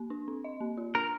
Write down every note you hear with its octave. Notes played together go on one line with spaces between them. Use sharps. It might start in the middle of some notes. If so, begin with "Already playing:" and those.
Already playing: A#3
D4
C4
D#5
A#3
F4
D4 A#4